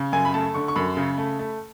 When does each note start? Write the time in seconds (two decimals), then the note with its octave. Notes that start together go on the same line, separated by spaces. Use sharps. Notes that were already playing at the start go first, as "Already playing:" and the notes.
Already playing: C#3
0.13 F#2 G#5
0.25 B5
0.34 A3 A5
0.54 D3 C#6
0.68 C#6
0.76 F#2 B5
0.97 C#3
1.18 A3
1.39 A3